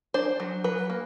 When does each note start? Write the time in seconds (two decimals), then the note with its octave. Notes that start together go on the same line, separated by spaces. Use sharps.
0.14 D4 C5
0.40 F#3
0.64 F#3 B4
0.90 A#3